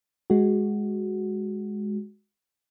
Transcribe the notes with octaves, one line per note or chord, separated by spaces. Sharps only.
G#3 F#4